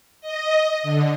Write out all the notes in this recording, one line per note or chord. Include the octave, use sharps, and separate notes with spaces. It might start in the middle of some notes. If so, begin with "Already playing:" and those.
D#5
D3